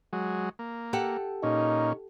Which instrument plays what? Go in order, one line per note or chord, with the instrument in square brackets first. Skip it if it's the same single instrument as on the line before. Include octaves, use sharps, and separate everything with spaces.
[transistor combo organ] F#3 G#3
A#3
[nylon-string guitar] G4 A4 F#5
[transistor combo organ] A#2 C#4 [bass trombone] D#4